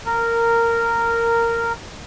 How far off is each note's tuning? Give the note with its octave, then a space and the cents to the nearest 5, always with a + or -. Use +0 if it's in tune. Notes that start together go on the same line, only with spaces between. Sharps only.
A#4 -10